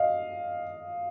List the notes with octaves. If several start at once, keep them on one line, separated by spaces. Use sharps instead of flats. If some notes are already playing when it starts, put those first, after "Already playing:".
Already playing: D#5 F5